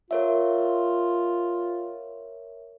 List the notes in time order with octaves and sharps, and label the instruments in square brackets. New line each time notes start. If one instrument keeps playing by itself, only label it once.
[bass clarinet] F4 [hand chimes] A#4 C#5 E5